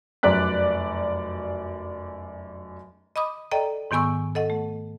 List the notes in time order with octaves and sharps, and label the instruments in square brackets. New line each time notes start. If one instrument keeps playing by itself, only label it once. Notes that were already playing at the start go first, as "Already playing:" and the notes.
[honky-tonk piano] F1 F#2 D5 F#6 B6
[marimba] D#5 B5 D6 D#6
A4 D5 D#5 G5 A#5
G#2 D#3 B3 G#5 C#6 E6
A4 D#5 F#5
A3